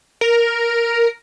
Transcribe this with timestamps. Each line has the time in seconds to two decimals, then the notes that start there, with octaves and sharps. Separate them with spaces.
0.21 A#4